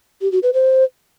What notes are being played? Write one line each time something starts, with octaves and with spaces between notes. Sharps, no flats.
G4
F#4
B4
C5